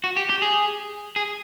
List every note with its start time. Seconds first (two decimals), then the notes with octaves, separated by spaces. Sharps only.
0.04 F#4
0.17 G4
0.30 G4
0.42 G#4
1.16 G#4